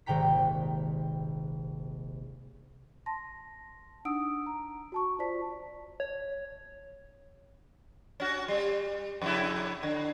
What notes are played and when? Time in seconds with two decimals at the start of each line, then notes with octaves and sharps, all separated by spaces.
0.06 D#1 G#1 C3 G5 A#5 B6
3.06 A5 C6 A#6
4.05 D4 D#4 F#5 D#6 E6 D7
4.46 A#5
4.92 F#4 A5 C#6
5.19 F4 C5 D5 A5 B6
6.00 C#5
8.20 C#4 F#4
8.48 G3
9.22 F2 C#3 E4
9.83 D3